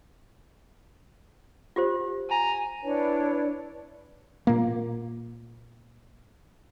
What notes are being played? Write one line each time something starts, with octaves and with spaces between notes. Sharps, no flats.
F4 G4 C5
G#5 A#5
D4 E4 B4 C#5
A#2 A#3